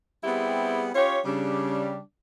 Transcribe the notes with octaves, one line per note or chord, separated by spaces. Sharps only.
G3 B3 C4 E4 G4 G#4
C#4 F4 G4 C#5
C#3 G3 D4